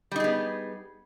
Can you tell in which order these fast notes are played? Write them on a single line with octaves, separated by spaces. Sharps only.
G3 D#4 G#4 B3